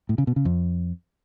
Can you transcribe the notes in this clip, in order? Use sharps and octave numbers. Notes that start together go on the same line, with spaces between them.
A2
C#3
B2
C#3
F2